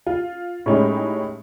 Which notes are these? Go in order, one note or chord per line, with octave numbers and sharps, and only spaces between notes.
F4
A2 G#3 C#4 D#4 G4